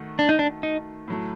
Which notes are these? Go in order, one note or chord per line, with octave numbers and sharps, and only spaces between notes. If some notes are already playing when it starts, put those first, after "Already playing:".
Already playing: D#3 A3 F#4 A4
D4
D#4
D4
D#4
A2 F#3 A3